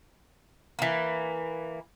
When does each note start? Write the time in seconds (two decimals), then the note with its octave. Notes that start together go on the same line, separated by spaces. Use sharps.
0.79 E3 A#3